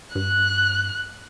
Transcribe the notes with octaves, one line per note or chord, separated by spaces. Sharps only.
G2 F#6